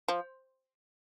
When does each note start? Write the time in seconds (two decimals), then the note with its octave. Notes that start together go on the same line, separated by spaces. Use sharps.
0.08 F3